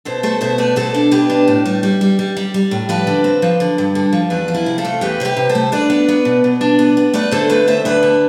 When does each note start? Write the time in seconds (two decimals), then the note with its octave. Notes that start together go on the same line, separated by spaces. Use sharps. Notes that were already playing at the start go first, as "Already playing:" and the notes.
0.05 B2 A4 C5
0.23 A3 A4 C5
0.41 B2 C5 E5
0.58 A3 B4 D5
0.76 B2 A4 C5
0.94 D4
1.11 B2 G4 B4
1.30 D4
1.48 A2
1.66 G3
1.83 G3
2.01 G3
2.19 G3
2.37 G3
2.54 G3
2.71 A2
2.89 F3 B4 D5
3.07 D3
3.24 C4
3.42 F3
3.60 D3
3.78 G2
3.95 D3
4.13 F3
4.30 E2 B4 D5
4.48 F3
4.54 E4
4.66 C3
4.78 F4 A4
4.85 A3
5.01 E2 G4 B4
5.20 C3 C5
5.25 G4 B4
5.37 C3
5.49 A4 C5
5.55 A3
5.72 D4 B4 D5
5.90 B3
6.08 B3
6.25 B2
6.44 B2
6.61 D4
6.79 B3
6.97 B3
7.14 A3 B4 D5
7.31 D3 A4 C5
7.50 A3 B4 D5
7.67 D2 C5 E5
7.85 D2 B4 D5
8.03 D3